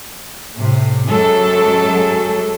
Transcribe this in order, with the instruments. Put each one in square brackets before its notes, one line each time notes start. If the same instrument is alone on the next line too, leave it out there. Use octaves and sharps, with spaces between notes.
[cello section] A2 C3
F#2 F#3 G#3 A4